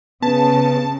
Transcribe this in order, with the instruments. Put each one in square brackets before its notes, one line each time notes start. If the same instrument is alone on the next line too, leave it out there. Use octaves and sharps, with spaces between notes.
[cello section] C#3 [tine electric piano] B3 [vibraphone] B4 [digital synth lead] A5